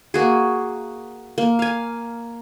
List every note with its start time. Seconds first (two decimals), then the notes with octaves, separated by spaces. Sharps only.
0.14 A#3 F#4 G#4
1.38 A#3
1.59 F5 G#5